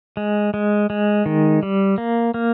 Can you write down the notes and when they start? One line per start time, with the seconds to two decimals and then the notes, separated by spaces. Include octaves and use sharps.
0.17 G#3
0.54 G#3
0.90 G#3
1.26 D#3
1.63 G3
1.98 A#3
2.34 A#3